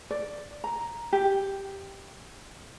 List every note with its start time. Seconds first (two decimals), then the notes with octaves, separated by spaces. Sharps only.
0.11 D5
0.64 A#5
1.13 G4